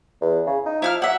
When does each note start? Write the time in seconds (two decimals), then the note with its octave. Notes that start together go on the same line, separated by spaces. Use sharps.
0.21 E2
0.46 C#3
0.66 D#4
0.82 F3 E4 F5 F6
1.02 F#3 E5 F#5